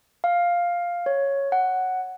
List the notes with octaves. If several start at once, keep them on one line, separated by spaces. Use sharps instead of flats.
F5
C#5
F#5